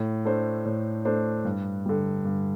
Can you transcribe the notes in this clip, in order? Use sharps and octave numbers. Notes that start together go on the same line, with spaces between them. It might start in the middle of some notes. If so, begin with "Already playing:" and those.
Already playing: A2
A3 D4 C5
A2
A3 D4 C5
G2
D3 G3
G2